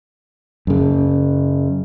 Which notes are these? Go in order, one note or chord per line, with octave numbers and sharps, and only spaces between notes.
F#2 C#3